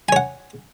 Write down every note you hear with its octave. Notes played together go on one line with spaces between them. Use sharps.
C#5 F#5 G#5